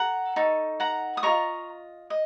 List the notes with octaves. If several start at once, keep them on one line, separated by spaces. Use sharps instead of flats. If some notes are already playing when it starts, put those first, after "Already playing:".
Already playing: A4 F#5 A#5
D#4 A4 C#6
F#5 A#5
D#6
F4 A#4 D#5 A#5 C#6
D#5